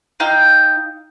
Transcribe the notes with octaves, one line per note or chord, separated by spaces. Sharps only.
D#4 F5 G5 E6